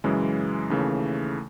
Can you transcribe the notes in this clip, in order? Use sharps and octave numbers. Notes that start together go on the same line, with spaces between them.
F#2 C#3 E3 G#3
D#2 C#3 E3 A3